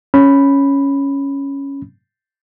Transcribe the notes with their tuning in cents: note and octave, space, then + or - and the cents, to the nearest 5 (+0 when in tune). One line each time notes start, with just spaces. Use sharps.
C#4 +0 B5 +0